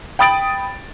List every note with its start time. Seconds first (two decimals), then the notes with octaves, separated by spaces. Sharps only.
0.19 G5 B5 D#6 A6 D7 F#7